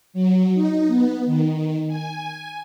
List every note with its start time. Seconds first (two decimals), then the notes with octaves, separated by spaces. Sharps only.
0.13 F#3
0.54 D#4
0.88 B3
1.26 D#3
1.88 G#5